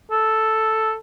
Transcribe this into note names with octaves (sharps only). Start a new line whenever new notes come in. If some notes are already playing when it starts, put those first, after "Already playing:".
A4